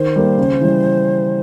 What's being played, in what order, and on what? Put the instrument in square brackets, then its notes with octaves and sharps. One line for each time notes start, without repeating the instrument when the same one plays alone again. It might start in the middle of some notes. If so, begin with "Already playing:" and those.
Already playing: [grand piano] D#3 [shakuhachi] C5
[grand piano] G3 A#3
C#3
E3 G3